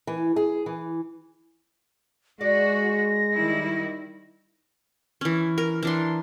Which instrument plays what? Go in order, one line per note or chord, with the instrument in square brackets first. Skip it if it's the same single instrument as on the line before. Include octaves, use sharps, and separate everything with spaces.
[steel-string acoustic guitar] E3
G#4
E3
[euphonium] G#3 [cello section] F#4 G#4 [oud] D5 [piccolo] A#6
[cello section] D#3 G3 E4
[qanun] E3 C#4
A#4
E3 D4 C6